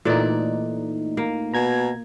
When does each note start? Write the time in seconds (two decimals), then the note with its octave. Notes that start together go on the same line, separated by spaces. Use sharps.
0.05 A#2 E3 A3 D#4 D5
1.17 A#3
1.54 B2 A#5 G#6